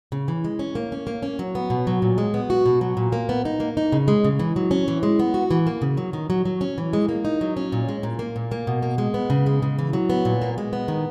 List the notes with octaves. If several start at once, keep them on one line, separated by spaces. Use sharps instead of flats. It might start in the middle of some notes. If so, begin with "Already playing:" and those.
C#3
E3
G#3
C#4
A#3
C#4
A#3
C#4
F#3
B3
B2
F#3
A#2
G#3
B3
F#4
B2
F#3
A#2
A#3
B3
D#4
A#3
D#4
C#3
G#3
C#3
E3
F#3
C#4
E3
G#3
B3
F#4
E3
A#3
C#3
F#3
D#3
F#3
F#3
C#4
E3
G#3
A#3
D#4
F#3
C#4
A#2
G#3
A#2
A#3
A#2
A#3
B2
A#3
G#3
B3
C#3
G#3
C#3
E3
F#3
B3
A#2
A#3
G#3
B3
D#3